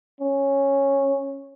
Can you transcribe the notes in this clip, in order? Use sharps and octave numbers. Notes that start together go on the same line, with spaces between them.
C#4